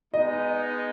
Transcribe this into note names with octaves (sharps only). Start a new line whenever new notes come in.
G#3 B3 D#4 D#5